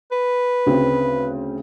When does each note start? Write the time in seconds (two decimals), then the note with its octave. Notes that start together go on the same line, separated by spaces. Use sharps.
0.12 B4
0.66 D2 C#3 C4